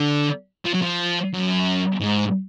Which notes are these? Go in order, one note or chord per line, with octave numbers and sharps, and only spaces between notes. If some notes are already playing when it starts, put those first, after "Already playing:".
Already playing: D3
F3
F#3
F3
F#2
G#2